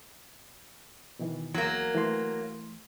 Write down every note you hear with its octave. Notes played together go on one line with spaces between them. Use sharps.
B2 D#3 E3
E2 F#3 A#3
E3 A3 C6